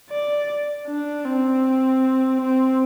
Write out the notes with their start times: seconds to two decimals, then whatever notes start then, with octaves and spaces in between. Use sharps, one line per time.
0.10 D5
0.87 D4
1.25 C4
2.41 C4